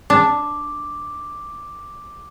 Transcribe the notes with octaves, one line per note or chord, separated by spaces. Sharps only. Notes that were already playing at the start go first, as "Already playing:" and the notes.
D4 D6